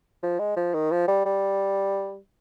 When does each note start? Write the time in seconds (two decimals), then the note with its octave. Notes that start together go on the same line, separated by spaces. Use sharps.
0.23 F3
0.39 G#3
0.57 F3
0.74 D#3
0.91 F3
1.08 G3
1.25 G3